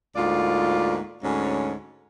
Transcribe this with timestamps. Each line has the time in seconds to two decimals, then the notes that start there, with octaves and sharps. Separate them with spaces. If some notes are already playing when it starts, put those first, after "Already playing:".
0.16 D2 G#2 A#3 F4 D5
1.23 D2 G#2 C#4